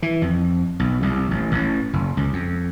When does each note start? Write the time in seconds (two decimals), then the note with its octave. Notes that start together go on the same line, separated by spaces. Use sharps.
0.02 E3
0.22 F2
0.79 B1
1.02 C2
1.31 A1
1.52 A1
1.93 F#1
2.17 C#2
2.33 F2